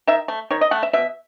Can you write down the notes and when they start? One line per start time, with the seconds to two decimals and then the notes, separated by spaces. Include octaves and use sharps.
0.07 D#3 E5
0.28 A3
0.51 D#3 C#5
0.61 D#5
0.71 A3 F#5
0.83 E5
0.93 B2 E5